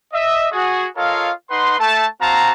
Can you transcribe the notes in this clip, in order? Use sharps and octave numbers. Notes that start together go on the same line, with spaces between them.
D#5 E5
F#4 G#4
F4 A4 A#4 C#5 D#5 F5
D#4 B4 F#5 C6
A3 A5
C4 F#4 F5 A5 A#5